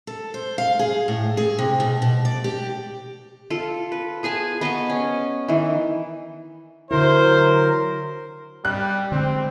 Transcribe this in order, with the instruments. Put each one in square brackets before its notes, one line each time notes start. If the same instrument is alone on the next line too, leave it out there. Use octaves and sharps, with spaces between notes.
[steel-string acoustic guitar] A4
C5
F5
G#4
A2
G#4
C3
B2
B2
D5
G4
[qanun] F4 A4
B4
B3 G#4 G#5 A5
B3 D#5 A#5 C#6
C#4
D#3 E3
[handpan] D3 E4 [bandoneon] F#3 A#4 [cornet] C5
[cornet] G3 [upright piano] F#6
[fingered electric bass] D3 G#3 [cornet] C4